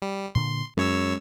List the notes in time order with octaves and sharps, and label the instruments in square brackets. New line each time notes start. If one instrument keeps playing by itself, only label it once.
[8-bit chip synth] G3
[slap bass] A#2 D3 [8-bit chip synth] C6
[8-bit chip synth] F#2 C#5 E6 [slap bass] G#3 C#4